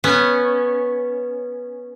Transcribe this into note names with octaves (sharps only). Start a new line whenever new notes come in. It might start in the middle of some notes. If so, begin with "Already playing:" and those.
B3 C#4